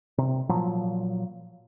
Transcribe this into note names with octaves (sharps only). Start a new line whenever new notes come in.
C3
A#2 F3 F#3